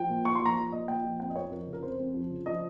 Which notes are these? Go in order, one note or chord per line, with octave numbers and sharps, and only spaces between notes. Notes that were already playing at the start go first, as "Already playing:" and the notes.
Already playing: F3 G5
A#2
A#2 C#6
C6
F3 A#5
F3
A#2 D#5
A#2 G5
F3
F2 G5
D#5
F2 C#5
F3 A#4
C#3
A#4
F2 C5
F2
F3
C#3
F3 D#5